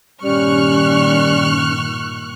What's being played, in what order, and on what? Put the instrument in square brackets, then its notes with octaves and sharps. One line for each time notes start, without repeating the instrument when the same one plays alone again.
[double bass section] G2 A#2 D#3 [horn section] G3 [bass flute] C#4 [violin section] C#6 F6 F#6